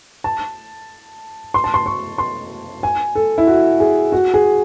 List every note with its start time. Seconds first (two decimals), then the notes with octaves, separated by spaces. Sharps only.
0.24 A5
1.54 C6
1.64 A5
1.74 C6
1.86 C#6
2.18 C6
2.83 G#5
3.15 A4
3.38 E4
3.47 F#4
3.80 G#4
4.12 F#4
4.34 G#4